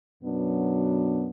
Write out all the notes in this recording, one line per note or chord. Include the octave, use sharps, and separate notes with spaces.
F#2 B2 F#3 B3 D4